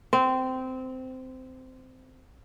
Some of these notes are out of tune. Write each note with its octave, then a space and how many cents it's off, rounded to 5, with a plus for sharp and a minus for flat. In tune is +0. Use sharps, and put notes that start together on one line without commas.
C4 -15